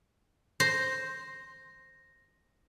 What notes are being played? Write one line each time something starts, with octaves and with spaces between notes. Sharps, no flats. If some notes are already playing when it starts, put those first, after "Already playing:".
C5 A#6